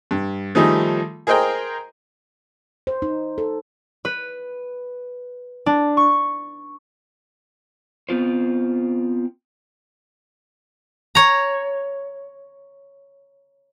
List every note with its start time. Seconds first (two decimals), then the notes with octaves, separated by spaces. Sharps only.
0.11 G2
0.55 D#3 F3 G3 A3 D#4 G#4
1.27 G#4 A#4 C5 D#5 G5 A#5
2.87 C5
3.02 D#4
3.38 A4
4.05 B4
5.66 D4
5.97 C#6
8.09 B3 C4 F4 C5
11.15 C#5 A#5